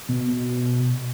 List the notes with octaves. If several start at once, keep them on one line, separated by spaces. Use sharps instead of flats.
B2